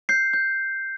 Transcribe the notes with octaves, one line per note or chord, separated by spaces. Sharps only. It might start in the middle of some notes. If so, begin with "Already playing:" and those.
G6 C7
G6